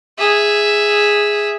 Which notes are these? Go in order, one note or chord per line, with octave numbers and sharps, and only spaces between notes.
G#4 E5